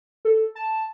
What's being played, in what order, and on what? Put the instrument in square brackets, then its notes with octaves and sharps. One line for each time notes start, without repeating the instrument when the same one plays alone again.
[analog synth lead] A4
A5